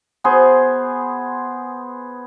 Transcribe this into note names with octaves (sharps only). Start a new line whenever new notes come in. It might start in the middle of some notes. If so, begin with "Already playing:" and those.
B3 G#4 C5